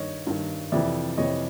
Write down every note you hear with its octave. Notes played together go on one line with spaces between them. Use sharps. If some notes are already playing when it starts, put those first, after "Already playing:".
Already playing: G2 D#3 C#5 D#5
G2 D#3
F2 C3 E3 D5 E5
F2 C3 E3 C#5 D#5